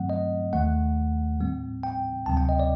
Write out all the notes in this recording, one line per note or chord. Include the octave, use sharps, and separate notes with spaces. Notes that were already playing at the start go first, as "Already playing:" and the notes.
Already playing: G2 D#3 F#3 A3 C4 F#5
D#5
D#2 D#3 A3 F#5
A2 G3 C4
G5
D2 C3 F#3 C4 A5
G5
D#5
D5